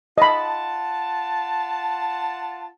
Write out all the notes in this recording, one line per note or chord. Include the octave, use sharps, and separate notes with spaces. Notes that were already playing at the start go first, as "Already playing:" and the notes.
F4 D#5 F#5 A5 B5